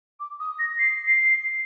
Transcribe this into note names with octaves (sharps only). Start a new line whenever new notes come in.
D6
D#6
A#6
C7
C7